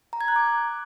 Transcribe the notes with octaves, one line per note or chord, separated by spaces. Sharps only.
A#5
G#6
F#6
D6